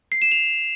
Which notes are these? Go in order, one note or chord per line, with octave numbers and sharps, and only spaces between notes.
C7
E7
F7